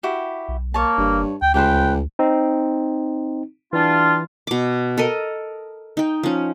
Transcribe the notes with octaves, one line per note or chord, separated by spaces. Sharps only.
E4 F#4 G4
B1
A#3 C#5 A5
F#1 G2
D2 G5
C#2 G4 B4 C5 G5
C4 D#4
E3 G3 D4 F4
B2 D6
A4 A#4 D#5
D#4 G5
F3 C#4